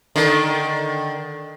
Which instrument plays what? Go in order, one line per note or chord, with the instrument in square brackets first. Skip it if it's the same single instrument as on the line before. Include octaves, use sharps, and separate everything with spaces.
[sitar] D3 D#3